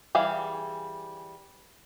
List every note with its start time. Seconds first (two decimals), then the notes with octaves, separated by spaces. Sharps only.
0.15 E3 G3 G#4 F5